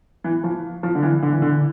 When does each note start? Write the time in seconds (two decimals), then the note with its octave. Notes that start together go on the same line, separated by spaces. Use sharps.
0.24 E3
0.44 F3
0.83 F3
0.95 D3
1.02 E3
1.22 D3
1.32 E3
1.42 D3